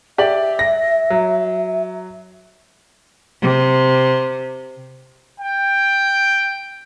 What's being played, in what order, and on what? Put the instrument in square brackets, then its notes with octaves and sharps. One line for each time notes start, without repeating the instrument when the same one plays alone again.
[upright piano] G4 D5 F#7 [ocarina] E5
[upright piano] A#6
F#3
[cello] C3
[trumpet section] G5